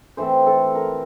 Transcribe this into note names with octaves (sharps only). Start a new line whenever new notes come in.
E3 A3 C4 C5
A4
A#4